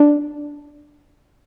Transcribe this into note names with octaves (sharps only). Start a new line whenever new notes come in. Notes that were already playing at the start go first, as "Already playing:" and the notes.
Already playing: D4